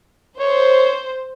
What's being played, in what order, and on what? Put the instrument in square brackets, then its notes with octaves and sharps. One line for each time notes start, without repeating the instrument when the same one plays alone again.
[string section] C5 [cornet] C#5